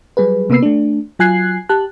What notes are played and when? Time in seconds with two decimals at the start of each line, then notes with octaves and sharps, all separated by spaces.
0.17 F#3 G3 G#4 B4
0.50 C3 A#3 B3 B4 E6 C7
0.62 A3 D4
1.19 F#3 F4 G#5 F#6 G#6 C7
1.69 G4 A5 F#6